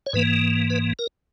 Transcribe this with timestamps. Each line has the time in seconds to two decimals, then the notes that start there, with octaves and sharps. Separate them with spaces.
0.06 C#5
0.13 G#2 E3 A#3 B4
0.70 B4
0.99 A#4